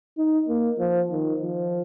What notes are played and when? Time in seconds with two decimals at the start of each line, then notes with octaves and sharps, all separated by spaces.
0.18 D#4
0.49 A#3
0.79 F3
1.12 D#3
1.42 F3